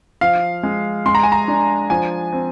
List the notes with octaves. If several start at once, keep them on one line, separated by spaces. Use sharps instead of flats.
F3 F5
G#3
G#3 C6
A#5
G#5
A#5
D4
F3 G#5
C4